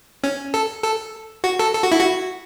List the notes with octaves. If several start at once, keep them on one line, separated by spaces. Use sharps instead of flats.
C#4
A4
A4
F#4
A4
A4
F#4
E4
F#4